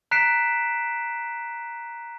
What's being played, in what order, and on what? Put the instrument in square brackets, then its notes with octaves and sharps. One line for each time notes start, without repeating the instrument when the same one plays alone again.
[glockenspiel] A#5 F#6 B6 C7 D7 E7